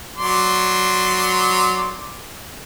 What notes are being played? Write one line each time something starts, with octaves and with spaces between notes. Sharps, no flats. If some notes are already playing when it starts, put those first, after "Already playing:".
F#3 D5 C6